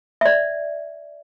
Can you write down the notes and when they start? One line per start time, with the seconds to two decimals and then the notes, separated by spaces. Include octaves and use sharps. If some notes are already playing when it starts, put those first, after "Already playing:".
0.21 E5
0.25 D5